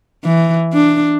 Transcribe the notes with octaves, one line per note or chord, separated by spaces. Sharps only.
E3
D4